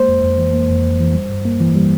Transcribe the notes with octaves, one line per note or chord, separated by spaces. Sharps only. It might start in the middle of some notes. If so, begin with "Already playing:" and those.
Already playing: G#3 A#3 C5
F2
F2
E3
A#3
F2
F2
E3
G3
G2
A#3
E3
G3